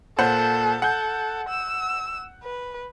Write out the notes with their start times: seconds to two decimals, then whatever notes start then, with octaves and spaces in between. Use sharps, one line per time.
0.18 A#2 A4 C5 F#5
0.82 A4 F#5 G6
1.49 E6
2.43 B4